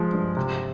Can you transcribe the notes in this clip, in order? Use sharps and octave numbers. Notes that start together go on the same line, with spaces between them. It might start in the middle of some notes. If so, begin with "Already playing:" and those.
Already playing: F3 G#3
G2
C3